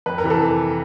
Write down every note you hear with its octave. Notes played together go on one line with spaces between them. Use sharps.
F2 B4
A#4
C3 E3
A4